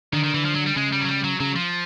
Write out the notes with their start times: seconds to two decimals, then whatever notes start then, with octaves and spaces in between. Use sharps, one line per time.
0.13 D3 D#3
0.24 D#3
0.34 E3
0.45 F3
0.55 F#3
0.66 G3
0.76 C#3 G#3
0.92 G3
1.01 F#3
1.08 G3
1.24 F#3
1.40 C#3 F#3
1.56 F3